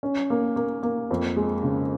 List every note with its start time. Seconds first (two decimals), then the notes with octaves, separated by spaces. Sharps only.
0.03 C#4
0.30 A#3
0.56 A#3
0.83 A#3
1.11 F2
1.36 G#3
1.63 C#3